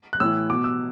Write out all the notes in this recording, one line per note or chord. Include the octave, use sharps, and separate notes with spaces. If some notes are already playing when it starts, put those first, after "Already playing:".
F#6
A2 E3 E6
B2 D6
E6